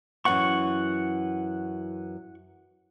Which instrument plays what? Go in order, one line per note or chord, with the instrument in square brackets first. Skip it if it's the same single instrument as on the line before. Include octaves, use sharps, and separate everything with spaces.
[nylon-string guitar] F#2 E3 [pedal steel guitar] F#5 C#6